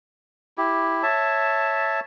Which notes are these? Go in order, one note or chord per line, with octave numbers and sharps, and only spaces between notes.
E4 G4
C#5 E5 A5